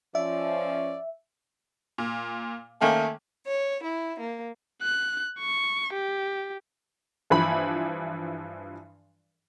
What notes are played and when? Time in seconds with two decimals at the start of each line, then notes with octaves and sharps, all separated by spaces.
0.15 F3 C#4 D5 E5
1.98 A#2
2.81 D#3 A3 A#3 C#4
3.46 C#5
3.82 E4
4.20 A#3
4.82 F#6
5.40 C#6
5.93 G4
7.30 G2 E3 F3 B5